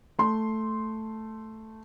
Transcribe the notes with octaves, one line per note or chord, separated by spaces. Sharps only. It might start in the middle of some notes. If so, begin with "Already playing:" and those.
A3 C6